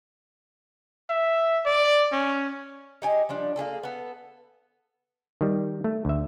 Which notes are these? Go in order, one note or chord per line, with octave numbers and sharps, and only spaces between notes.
E5
D5
C#4
D#4 G4 G#5
F3 G3 D4
A#3 C#4 G#4 A4
B3 A4
D#3 G3
A3
D2 E5